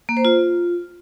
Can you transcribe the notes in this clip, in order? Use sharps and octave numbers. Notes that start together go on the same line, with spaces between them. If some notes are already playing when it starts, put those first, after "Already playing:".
A#3
C5
F4